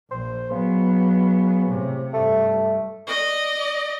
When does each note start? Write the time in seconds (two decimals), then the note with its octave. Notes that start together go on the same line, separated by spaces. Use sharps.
0.11 A#1 C5
0.51 C#3 F#3 B3
1.68 A2 C3
2.13 G2 A3
3.07 D5 D#5